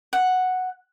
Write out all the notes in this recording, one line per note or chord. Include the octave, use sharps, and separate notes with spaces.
F#5